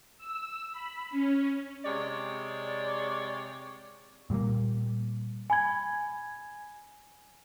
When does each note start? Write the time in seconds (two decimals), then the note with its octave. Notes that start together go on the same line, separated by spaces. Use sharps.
0.17 E6
0.72 B5
1.10 C#4
1.85 C3 G#3 C#5 D5
4.30 A#2 G3 G#3 A#3
5.50 G#5 B5 G#6